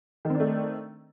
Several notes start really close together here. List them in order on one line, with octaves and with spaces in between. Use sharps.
D#3 C4 D4 A3